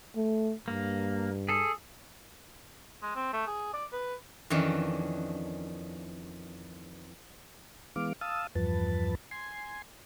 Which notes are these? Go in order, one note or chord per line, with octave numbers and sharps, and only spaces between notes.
A3
G2 A#3
G#4 A4
G#3
C4
A3
G#4
D5
B4
F2 D#3 E3 C#4 D4
E3 G#3 B3 F5 D6
F5 A5 D#6 E6
E2 G2 F3 B4 A5
G#5 C6